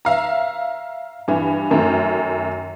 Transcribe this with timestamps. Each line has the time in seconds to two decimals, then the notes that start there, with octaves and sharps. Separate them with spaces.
0.05 E5 F5 A#5
1.28 G2 E3
1.71 F#2 D#3 A3